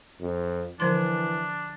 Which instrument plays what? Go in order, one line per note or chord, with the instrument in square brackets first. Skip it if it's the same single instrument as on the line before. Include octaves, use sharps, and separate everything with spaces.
[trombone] F2
[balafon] D3 F3 C6 [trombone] E3 [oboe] D4